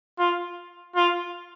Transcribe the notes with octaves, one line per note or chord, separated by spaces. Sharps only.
F4
F4